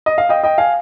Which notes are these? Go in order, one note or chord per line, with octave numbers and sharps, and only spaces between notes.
D#5
F5
D#5 G5
D#5 G5
F5 G#5